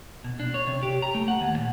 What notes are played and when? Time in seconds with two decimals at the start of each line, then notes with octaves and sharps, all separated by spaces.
0.24 B2
0.40 D4
0.54 C#5
0.67 C3
0.83 G4
1.02 A#5
1.15 A3
1.28 F#5
1.41 D#2
1.57 A#2